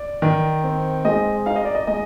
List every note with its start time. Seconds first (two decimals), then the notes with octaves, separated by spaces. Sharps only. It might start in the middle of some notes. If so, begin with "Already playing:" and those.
Already playing: D5
0.22 D#3
0.64 C4
1.05 G#3 D#5
1.46 D#4 F5
1.56 D#5
1.65 D5
1.75 D#5
1.87 G#3 D#5